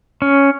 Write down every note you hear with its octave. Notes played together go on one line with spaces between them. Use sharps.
C#4